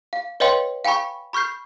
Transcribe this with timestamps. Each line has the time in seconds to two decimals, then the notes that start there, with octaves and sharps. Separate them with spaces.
0.13 F5
0.40 B4 C#5 D#5 F5 G5 C6
0.85 F5 G5 G#5 B5 C#6
1.33 B5 C#6 F6 G6 C7